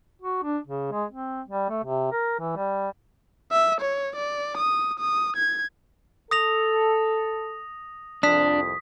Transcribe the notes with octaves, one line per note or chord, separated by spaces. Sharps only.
F#4
D4
C#3
G#3
C4
G3
A3
C3
A#4
E3
G3
E5
C#5
D5
D#6
D#6
G#6
A4 D#6 A#6 F7
C2 F2 D4 D#6 B6